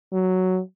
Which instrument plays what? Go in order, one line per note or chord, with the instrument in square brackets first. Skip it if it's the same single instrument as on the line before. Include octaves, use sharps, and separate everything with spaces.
[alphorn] F#3